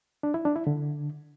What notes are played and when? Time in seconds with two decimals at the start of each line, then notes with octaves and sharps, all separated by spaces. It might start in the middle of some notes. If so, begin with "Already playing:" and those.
0.23 D4
0.34 E4
0.45 D4
0.56 E4
0.67 D3